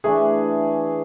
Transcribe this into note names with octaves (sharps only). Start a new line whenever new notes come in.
E3 A3 D4 G#4